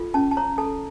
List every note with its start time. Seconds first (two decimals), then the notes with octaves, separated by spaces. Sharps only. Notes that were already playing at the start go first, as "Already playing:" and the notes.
Already playing: F4 A4
0.14 C#4 A5
0.31 A5
0.37 C#5 A#5
0.58 A4 A5